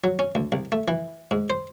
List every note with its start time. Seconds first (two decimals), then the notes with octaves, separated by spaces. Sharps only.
0.04 F#3
0.19 C#4
0.35 D2
0.52 C2
0.72 A3
0.88 E3
1.31 G#2
1.50 C5